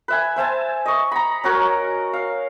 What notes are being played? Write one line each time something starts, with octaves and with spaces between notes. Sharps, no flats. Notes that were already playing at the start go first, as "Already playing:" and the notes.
B4 E5 G#5
C5 E5 G#5 A5
D#5 C#6
A#5 B5
C#4 F#4 A#4 C#5
F5